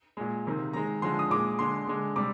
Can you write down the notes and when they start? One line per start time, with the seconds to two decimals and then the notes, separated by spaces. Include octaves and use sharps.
0.17 A#2 G#3
0.45 C3 D#3 A#3
0.73 D#3 G#3 A#5
1.02 D3 F3 G#3 C6
1.19 D#6
1.30 A#2 G#3 D6
1.59 D3 G#3 C6
1.87 D3 G#3
2.16 C3 G3 D6